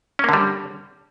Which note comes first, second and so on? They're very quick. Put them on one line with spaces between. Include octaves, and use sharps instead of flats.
C#4 A#3 D3 G3